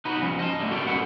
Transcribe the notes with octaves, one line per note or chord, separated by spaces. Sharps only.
D#4 F#4 B4
F3 C#4
D#5 A5
D3 G3 A3
C#4 F#4 G4 A#4 D5
G#3 F#4 A4 B4 F#5